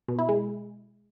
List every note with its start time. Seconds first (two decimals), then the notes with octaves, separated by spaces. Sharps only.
0.08 B2
0.19 E4
0.29 G#3